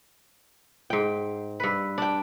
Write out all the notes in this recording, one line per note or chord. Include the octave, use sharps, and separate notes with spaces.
G#2 G5
G2 B4
D4 G5